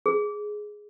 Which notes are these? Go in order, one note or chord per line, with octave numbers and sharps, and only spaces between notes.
G#4